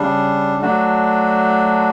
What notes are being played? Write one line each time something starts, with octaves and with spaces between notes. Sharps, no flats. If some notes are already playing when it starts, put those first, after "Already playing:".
Already playing: C#3 G3 D4
F#3 A3 D4 F#4